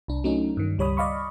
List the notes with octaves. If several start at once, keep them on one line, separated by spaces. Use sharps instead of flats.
C2 D4
F#3 A3 C#4 D#4
G2 D#3
C#2 G3 C#5 B5 D#6
D5 D#5 F5 B5 C#6